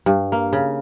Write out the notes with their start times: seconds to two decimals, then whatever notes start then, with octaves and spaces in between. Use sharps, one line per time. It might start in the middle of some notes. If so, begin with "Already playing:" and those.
0.06 G2
0.32 A#3
0.53 C#3